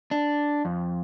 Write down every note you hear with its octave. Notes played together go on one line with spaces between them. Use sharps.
D4
F2